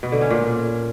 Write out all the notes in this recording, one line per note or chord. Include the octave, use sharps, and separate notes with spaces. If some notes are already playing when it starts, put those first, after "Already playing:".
B2
D3
C#4
A#2